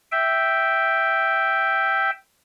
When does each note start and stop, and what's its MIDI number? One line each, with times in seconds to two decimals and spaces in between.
0.12 2.10 76
0.12 2.10 79